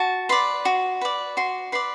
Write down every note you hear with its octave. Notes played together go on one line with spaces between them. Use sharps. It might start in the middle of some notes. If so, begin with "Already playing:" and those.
Already playing: F#4 A5
B4 D5 C6
F#4
B4 D5
F#4 C6
B4 D5 C6